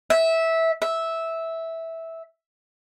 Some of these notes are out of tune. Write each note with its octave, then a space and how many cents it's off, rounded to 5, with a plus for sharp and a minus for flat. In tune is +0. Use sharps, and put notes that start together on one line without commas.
E5 -15
E5 -10